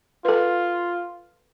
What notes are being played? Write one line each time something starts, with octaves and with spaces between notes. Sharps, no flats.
F4 A4 B4